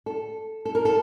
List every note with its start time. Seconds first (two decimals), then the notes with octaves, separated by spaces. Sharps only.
0.06 A4
0.65 A4
0.75 A#4
0.85 A4